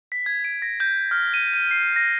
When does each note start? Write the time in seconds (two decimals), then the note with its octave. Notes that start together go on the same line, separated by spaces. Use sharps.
0.12 B6
0.26 G#6
0.45 D7
0.62 A#6
0.80 G6
1.11 F6
1.34 D#7
1.54 D#7
1.71 C7
1.96 A#6